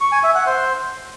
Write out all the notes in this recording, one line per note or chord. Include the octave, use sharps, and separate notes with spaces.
C#6
G#5
E5
F#5
C5